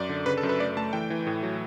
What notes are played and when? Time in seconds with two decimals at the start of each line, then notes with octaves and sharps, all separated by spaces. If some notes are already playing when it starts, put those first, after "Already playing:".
Already playing: F#2 D5
0.09 D3
0.26 C#3 B4
0.37 A4
0.43 F#2
0.49 B4
0.59 A3 D5
0.77 A3 A5
0.93 E3 G5
1.10 E3
1.27 A2
1.43 F#3